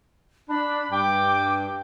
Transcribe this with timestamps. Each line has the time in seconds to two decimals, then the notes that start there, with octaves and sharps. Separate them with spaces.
0.49 D4 B5
0.92 G2 G5 D6